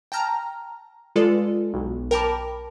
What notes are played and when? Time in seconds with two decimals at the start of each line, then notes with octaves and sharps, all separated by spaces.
0.12 G5 A5 A#5 F6
1.16 G#3 F4 A4 B4 D5
1.73 B1
2.11 A#4 G5 A5 B5 D6